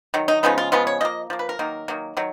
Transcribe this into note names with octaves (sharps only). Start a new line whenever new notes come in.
D#3 F#3
D#4
C#3 F3 G#3 B3 D#4
F4
C#3 F3 G#3 B3 F4
C#5
F3 A#3 D#5
F3 A#3
B4
A#4
D#3 F#3 A#3
D#3 F#3 A#3
D#3 F#3